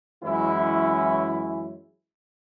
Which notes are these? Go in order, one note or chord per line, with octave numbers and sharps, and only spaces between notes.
F#2 E3 G#3 C#4 E4